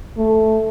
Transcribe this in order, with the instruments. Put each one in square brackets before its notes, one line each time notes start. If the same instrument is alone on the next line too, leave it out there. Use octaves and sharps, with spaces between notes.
[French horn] A3